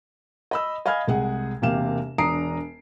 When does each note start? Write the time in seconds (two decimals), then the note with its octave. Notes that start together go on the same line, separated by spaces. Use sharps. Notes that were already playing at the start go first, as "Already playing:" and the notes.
0.51 D#5 B5 E6
0.86 D#5 F5 G#5 B5 F6 G#6
1.08 C2 G#3 G#4 F#5
1.62 E1 C3 A#3 G4 F5 E7
2.18 E1 D4 A#5 D#6 C7 D7